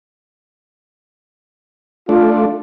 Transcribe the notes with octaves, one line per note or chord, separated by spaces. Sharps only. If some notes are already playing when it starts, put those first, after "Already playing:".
A3 D4 F4